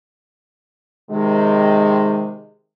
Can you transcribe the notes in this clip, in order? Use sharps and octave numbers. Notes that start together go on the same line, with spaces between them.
C3 D#3 G#3